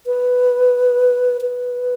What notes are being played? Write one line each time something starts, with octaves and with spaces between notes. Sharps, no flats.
B4
B4